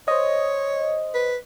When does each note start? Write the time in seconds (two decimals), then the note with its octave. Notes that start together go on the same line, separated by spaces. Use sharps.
0.08 C5 C#5 D#5
1.14 B4